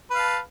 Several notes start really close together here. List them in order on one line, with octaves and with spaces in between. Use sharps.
B4 F5 A5